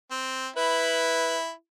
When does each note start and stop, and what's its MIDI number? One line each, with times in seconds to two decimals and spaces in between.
0.11 0.48 60
0.56 1.51 64
0.56 1.36 71